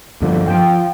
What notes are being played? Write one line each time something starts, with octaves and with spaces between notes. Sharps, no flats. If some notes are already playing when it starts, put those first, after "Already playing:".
G2 D3 F3
F3 G5